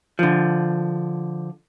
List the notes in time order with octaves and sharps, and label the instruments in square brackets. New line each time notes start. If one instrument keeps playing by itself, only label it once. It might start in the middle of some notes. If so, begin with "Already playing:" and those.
[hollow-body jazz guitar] D3 F3